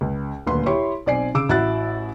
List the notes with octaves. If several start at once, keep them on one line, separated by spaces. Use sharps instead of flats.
C#2
D#1 D2 A#2 B4 C6
E4 G4 C#5 C6 C#6
B1 C4 D5 G#5 C7
C#3 D6 E6 D7
A1 E4 F#4 F#6 A6